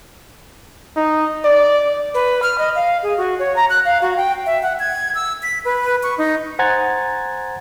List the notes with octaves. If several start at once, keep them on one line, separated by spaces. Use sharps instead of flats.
D#4
D5
B4
F6
D#5
F5
G#4
F#4
C#5
A#5
F#6
F5
F#4
G5
E5
F#5
G#6
E6
B6
B4
C#6
D#4
C5 F#5 G#5 A#5 G#6 A6